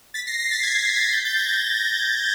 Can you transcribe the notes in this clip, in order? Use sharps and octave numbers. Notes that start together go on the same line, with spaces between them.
A6 B6
A#6 C7
A#6 C7
A6 B6
G#6 A#6
G#6 A#6
A6 B6
G6 A6
G6 A6
G#6 A#6